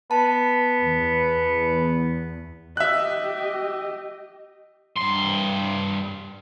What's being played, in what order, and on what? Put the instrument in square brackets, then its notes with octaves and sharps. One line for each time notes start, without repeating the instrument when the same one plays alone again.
[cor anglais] B3 [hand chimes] A5
[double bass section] E2
[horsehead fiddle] G4 D#5 [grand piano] E5 F#6
[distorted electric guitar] G2 C6